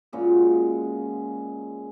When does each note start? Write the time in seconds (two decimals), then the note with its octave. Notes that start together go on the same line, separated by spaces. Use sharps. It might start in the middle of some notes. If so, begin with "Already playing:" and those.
0.13 A#2 C#3 G#3 F#4